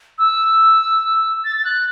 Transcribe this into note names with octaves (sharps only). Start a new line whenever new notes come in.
E6
A6
A6
F#6